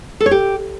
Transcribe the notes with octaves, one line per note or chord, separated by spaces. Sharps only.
A4
C#5
G4